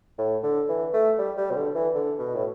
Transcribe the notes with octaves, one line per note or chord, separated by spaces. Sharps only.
A2
D3
E3
A3
G3
G3
B2
D3
E3
D3
B2
A2